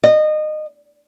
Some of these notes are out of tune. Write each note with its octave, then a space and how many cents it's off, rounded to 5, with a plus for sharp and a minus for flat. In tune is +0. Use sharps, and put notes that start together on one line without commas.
D#5 -25